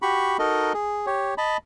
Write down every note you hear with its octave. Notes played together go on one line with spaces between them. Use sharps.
F#4 G4 B5 C#6
D#4 F#4 A4 A#4 D#5
G#4
G4 C#5
D#5 A5 B5